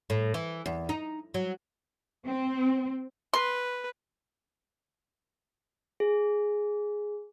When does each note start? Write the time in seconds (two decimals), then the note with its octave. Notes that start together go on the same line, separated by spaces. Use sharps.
0.10 A2
0.34 E3
0.66 E2
0.89 D#4
1.34 F#3
2.26 C4
3.33 B4 C6
6.00 G#4